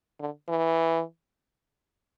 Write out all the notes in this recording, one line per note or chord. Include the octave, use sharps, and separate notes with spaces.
D3
E3